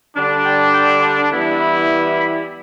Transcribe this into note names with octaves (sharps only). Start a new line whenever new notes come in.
D3 G3 D4
G5
G5
E3 G3 B3 E4
B5
B5